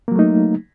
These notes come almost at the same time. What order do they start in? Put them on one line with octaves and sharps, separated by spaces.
A#3 F#3 A3 D#4